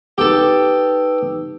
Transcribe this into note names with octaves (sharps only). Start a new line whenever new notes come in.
D#4 G4 A4 B4 E6